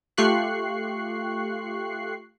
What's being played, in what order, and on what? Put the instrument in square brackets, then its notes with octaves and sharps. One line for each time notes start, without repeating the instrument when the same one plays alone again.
[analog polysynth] A3 F4 G4 C#6 F#6 C7